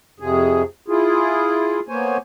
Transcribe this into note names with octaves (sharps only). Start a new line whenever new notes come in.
F2 C3 G#4
E4 F4 G#4
A#3 B3 C5 C#5 G#5